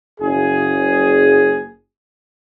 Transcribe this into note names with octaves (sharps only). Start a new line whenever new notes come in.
F#1 G#4